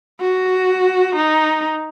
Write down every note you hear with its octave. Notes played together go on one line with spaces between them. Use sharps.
F#4
D#4